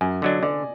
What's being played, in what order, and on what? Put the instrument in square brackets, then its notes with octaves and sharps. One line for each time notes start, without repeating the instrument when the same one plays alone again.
[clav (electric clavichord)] F#2 [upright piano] G#5
[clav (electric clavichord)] D3 F#3 D4 [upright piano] D#5
[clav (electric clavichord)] D3 [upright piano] D5